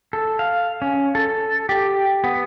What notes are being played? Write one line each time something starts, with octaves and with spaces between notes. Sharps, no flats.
A4
F5
C#4
A4
G4
B3